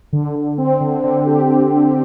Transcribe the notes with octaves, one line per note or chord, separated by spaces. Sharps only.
D3
D3
C4
D3
D3
G4